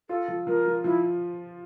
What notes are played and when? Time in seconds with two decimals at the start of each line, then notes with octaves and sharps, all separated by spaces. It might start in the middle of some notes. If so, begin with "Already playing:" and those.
0.09 F4 A4
0.28 F3
0.47 F3 A#4
0.66 F3
0.84 F3 E4